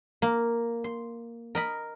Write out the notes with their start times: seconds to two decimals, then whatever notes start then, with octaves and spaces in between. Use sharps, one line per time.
0.22 A#3
0.84 C6
1.55 A#4 D#5 B5